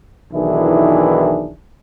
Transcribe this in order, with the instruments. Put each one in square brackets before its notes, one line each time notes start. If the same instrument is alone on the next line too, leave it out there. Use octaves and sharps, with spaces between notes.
[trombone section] B1 D#3 E3 D4 E4 G#4